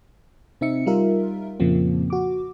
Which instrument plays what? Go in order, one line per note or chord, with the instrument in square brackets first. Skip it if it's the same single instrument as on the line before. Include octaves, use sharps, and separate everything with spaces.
[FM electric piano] C3 C4 D#4 E5 C#7
G3 D#4 F4 A#4 E5
F2 A#2 C#3 F3 A#3 C4
F#4 D6